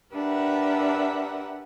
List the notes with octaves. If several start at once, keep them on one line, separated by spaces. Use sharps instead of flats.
D4 G4 A#4 B4 E5 F#5